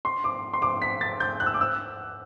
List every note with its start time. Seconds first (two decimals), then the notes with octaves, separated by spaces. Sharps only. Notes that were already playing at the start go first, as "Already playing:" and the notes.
0.05 C6
0.24 D6
0.53 C6
0.62 D6
0.82 B6
1.01 A6
1.20 G6
1.40 F#6
1.46 E6
1.54 D6
1.61 E6